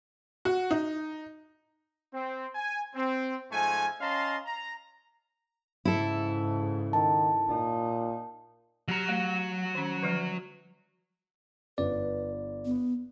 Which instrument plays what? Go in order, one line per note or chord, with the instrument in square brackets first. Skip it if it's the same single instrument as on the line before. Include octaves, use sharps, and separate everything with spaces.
[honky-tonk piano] F#4
D#4
[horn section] C4
G#5
C4
G#2 F3 A3 G#5
C#4 D#5 F5 A5 A#5 C6
A#5
[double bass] G#2 C#3 [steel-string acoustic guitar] E4 A4
[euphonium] D#3 [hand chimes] A5
[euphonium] A#2 [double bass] D#4
[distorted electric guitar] F#3 A#5 [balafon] G4
[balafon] A3
D#3 C#4
D3 F3 G3
[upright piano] G1 [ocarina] B4 [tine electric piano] D5
[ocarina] B3